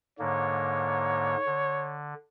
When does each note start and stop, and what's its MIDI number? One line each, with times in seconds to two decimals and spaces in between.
0.19 1.36 44
0.19 1.36 50
0.19 1.36 58
0.19 1.99 73
1.46 2.14 50